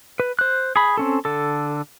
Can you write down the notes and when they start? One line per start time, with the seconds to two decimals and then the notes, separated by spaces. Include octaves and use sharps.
0.20 B4
0.39 C5 F#6
0.76 G#4 B5
0.98 C4 C#4 A4
1.25 D3 A4